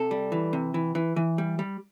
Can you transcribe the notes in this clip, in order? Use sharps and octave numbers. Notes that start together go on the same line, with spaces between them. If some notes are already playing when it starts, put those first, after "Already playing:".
Already playing: C3 A4
G3
E3
C3
E3
E3
E3
G3
G3